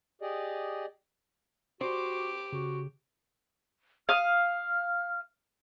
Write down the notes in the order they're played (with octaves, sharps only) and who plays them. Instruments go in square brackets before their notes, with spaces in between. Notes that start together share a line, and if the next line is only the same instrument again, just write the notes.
[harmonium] G4 G#4 D5 D#5
[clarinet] F#4 [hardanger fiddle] G4 D6 [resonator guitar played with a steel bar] C5
[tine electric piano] C#3 [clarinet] F#4
[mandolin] F5 D#6 [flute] F6